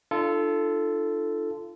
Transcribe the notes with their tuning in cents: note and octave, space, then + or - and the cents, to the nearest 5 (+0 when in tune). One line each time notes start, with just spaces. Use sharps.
D4 +30 F4 -25 A4 +0